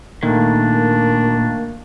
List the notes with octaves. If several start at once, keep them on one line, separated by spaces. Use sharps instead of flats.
A#2 D#3 A3 A#3 D4